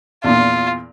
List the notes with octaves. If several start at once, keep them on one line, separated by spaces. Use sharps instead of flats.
E2 A#2 F4